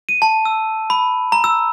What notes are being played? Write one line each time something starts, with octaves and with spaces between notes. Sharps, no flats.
D#7
A5
E6
B5
A#5
E6